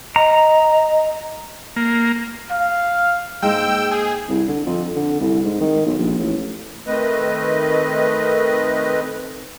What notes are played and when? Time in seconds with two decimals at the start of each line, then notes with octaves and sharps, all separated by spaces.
0.16 D#5 A#5
1.76 A#3
2.51 F5
3.42 G#2 G#3 A#3 G5 E6
3.91 G#4
4.28 C2
4.48 D3
4.66 F2
4.95 D3
5.20 C2
5.44 G#2
5.61 D#3
5.86 B1
5.98 A#1
6.18 A1
6.86 D#3 A3 C4 B4 D#5